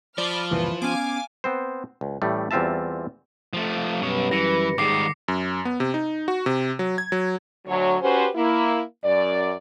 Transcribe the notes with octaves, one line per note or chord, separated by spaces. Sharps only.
F3 D5 B5 D6 F6
F#1 C2 A#2 E3 B4
B3 C#4 F5 G#5 D6
B3 C4 C5
C#2
A1 A2 G3 A3
E2 G3 C4 F4 E5 A5
F3 A3
F#2 B2 G3 B4 C#5
E3 A#6 C#7
G#2 D#3 G3 D6 C7
F#2
B3
C3
D#4
F#4
C3
F#3
G#6
F#3
D2 F#3 C#5
C#4 F#4 G4 B4 C5
A#3 E4
F#2 D5